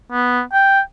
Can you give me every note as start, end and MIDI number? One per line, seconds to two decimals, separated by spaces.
0.12 0.41 59
0.53 0.81 79